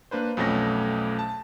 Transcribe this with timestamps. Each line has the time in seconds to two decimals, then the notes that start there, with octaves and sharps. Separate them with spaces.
0.11 A#3 D4 B4 C5
0.37 B1 F2 B2 A3 C#4 A#6
1.19 A5